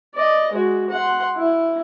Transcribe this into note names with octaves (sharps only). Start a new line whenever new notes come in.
D5 D#5
G#3 F#4
F#5 C6
E4